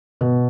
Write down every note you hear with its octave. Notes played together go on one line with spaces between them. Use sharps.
B2